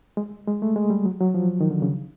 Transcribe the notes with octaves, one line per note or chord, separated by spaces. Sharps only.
G#3
G#3
A3
G#3
G3
F#3
F#3
F3
D#3
D3
C#3